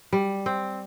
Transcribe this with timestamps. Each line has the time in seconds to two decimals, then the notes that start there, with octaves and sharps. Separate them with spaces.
0.13 G3
0.46 C4